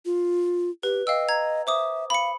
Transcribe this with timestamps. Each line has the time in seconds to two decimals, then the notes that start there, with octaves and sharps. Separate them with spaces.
0.05 F4
0.83 G4 B4
1.07 D#5 F5 G5 E6
1.29 A#5 G#6
1.67 C5 E5 D6 D#6
2.10 F5 B5 C#7